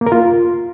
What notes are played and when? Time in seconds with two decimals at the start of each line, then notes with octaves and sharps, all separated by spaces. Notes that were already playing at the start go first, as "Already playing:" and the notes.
0.01 A#3
0.06 A#4
0.12 F4